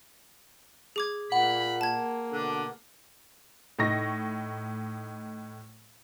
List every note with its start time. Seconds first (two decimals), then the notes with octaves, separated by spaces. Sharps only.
0.96 G#4 D6 G#6
1.32 A#2 F#5 B5
1.81 A#3 A5 G#6
2.33 B2 D3 D4
3.79 A2 D#4 C#6 A#6